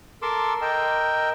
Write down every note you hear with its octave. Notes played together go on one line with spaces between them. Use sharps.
A4 A#4 C6 D6 E6
A#4 D#5 G5 E6